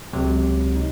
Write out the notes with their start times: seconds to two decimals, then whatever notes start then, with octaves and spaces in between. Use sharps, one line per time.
0.13 C#2 C3 F#3
0.76 D#4